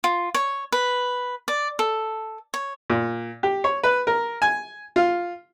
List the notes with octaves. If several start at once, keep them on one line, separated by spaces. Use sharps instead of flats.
F4
C#5
B4
D5
A4
C#5
A#2
G4
C#5
B4
A#4
G#5
F4